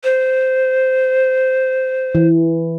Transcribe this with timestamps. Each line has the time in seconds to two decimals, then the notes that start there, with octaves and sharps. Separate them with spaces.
0.04 C5
2.15 E3